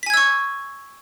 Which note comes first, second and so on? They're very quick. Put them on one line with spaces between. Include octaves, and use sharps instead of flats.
B6 G#5 G#6 E6 C#6